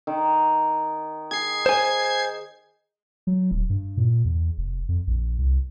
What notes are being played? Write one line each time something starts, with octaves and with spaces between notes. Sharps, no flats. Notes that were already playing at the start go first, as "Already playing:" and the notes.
D#3
G#4 G#6 C7
C5 G#5
F#3
D#1
G2
A#2
E2
F1
F2
A#1
C2